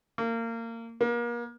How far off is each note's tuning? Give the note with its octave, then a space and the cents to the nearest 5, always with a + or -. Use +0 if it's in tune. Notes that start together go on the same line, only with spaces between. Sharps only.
A#3 -25
A#3 +35